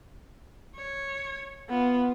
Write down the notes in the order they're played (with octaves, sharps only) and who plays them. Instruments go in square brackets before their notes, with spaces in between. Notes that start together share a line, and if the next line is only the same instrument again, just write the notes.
[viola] C#5
[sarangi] B3 [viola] F4